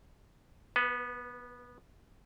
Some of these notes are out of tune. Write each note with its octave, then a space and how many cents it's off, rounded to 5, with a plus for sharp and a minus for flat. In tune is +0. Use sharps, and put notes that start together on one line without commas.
B3 -15 B4 +25